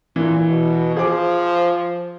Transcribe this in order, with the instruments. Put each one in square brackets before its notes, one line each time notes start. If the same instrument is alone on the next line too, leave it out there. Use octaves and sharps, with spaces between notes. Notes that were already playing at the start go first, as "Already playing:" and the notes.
[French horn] A#2 [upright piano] E3
[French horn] B2
[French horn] F3 [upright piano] G#4 D6